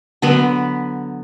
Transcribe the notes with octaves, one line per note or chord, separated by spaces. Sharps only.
D3 F#3 B3 B4